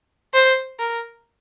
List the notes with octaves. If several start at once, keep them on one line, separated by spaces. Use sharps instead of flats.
C5
A#4